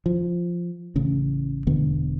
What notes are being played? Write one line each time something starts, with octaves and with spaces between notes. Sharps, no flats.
F3
A1 C#3
E1 D3 B3